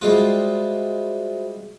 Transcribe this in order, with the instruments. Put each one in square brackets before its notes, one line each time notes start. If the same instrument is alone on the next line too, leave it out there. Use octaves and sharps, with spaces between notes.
[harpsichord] G3 G#3 F4 [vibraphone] F#4 C5 E5